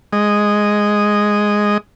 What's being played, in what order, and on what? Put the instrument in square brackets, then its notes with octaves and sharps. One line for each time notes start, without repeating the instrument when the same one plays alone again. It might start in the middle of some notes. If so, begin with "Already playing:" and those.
[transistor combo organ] G#3 D#5